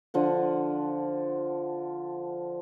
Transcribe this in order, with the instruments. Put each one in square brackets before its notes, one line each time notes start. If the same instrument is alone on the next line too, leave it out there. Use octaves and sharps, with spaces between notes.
[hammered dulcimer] D3 F3 F#5